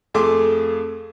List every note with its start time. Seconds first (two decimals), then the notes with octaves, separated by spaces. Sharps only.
0.14 F2 A3 G#4 A4 C6 D6